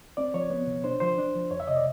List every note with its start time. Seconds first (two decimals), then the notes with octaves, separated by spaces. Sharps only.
0.17 C4 D5
0.34 F3 C#5
0.50 B3
0.67 B2
0.84 D4 C5
1.00 F3 C5
1.18 D4
1.35 F3
1.50 F2 C#5
1.60 E5
1.67 C3 D#5
1.76 D5